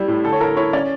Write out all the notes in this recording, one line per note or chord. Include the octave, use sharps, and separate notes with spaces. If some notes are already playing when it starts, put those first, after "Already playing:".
Already playing: G3 E4
A2
D3 A4
C#5
E4 A#4
E4 C#5
C#4 D5